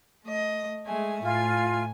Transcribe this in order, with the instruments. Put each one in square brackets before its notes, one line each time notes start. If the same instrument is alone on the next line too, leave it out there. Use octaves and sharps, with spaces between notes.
[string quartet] A3 D#5
G#3 A3 G#5
[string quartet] A2 G#5 [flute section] F4